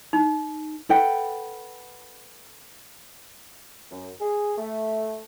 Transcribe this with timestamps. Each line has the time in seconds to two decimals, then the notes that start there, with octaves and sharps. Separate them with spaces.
0.13 D#4
0.89 A4 B4 F#5 G5
3.90 F#2
4.21 G#4
4.58 A3